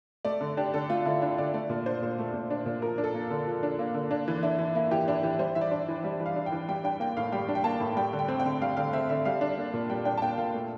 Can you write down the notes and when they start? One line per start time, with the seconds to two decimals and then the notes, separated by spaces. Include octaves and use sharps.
0.25 A3 D5
0.41 D3
0.57 D4 G4
0.74 D3 A4
0.89 A3 F4
1.05 D3 E4
1.21 D4 E4
1.38 D3 D5
1.54 A3 D5
1.70 A#2
1.86 D4 C5
2.02 A#2
2.19 A3
2.34 A#2
2.50 D4
2.66 A#2
2.82 F3 A#4
2.98 D4
3.04 A4
3.14 A#3
3.30 D3
3.47 F3
3.63 D4
3.79 A#3
3.94 D3
4.11 A#3 D4
4.28 E3
4.43 D4 E4
4.59 E3
4.75 A#3 E4
4.91 E3 G4
5.08 D4 E4
5.23 E3 G4
5.39 G3 C5
5.55 E3 E5
5.61 D5
5.71 D4
5.88 E3
6.04 G3 E5
6.20 E3
6.26 F5
6.36 D4
6.46 G5
6.52 E3
6.68 G3 G5
6.84 D4 G5
7.00 A#3 G5
7.17 A2 F5
7.32 G3 G5
7.49 D4
7.55 G5
7.64 A#3 A5
7.80 A2
7.97 G3 G5
8.13 D3
8.19 G5
8.28 C4
8.40 G5
8.45 D3
8.61 G3 F5
8.77 D3 F5
8.93 C4 E5
9.09 D3 E5
9.25 G3 F5
9.41 D4
9.57 A#3
9.74 A#2
9.90 G3 G5
10.05 D4 G5
10.17 A5
10.22 A#3 G5
10.37 A#2 F5
10.54 A3